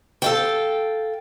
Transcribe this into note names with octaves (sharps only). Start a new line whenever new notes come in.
A4 F5 G5